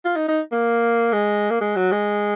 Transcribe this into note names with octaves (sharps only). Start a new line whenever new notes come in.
F4
D#4
D#4
A#3
G#3
A#3
G#3
F#3
G#3